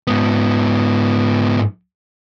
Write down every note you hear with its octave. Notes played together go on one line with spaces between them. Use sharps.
G#2 B3